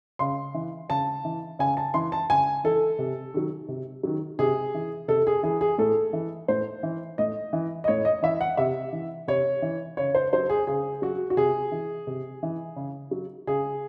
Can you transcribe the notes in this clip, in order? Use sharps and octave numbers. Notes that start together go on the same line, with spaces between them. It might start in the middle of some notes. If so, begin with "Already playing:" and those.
C#3 C6
E3
C#3 A5
E3
C#3 G#5
A5
E3 C6
A5
C#3 G#5
E3 A4
C3
D#3 F#3
C3
D#3 F#3
C3 G#4
E3
C3 A4
G#4
E3 G#4
G#4
A2 A4
E3
A2 C5
E3
A2 D#5
E3
D#5
A2 C#5
D#5
E3 E5
F#5
C3 E5
E3
C3 C#5
E3
C#3 C#5
C5
F#3 C5
G#4
C#3 G#4
F#3 F#4
F#4
C3 G#4
E3
C3
E3
C#3
F#3
C#3 G#4